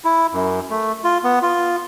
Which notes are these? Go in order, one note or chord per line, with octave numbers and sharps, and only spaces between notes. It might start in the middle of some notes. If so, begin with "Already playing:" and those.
E4
F#2
A3
F4
B3
F4